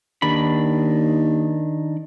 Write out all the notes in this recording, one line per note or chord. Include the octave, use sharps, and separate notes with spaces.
D#2 D#3 D4 B5